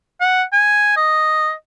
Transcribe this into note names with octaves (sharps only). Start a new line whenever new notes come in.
F#5
G#5
D#5